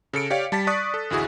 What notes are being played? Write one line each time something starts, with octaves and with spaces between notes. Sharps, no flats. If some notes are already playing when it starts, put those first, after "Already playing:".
C#3 A4 C#7 D7
G4 C#5 D5 F5
G3 A5 A6 B6
D5 C#6 D#6 F#6 B6
A4
A1 D2 E4 F#4 G#4